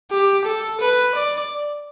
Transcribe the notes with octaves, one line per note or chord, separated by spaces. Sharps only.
G4
A4
B4
D5